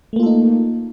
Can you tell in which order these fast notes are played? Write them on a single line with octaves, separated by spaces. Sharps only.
A3 A#3 F4 A4 D#4